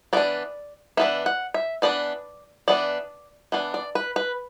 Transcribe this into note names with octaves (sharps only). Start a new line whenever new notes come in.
E3 B3 D4 D5
E3 B3 D4 E5
F#5
E5
E3 B3 D4 D5
E3 B3 D4 D5
E3 B3 D4
D5
B4
B4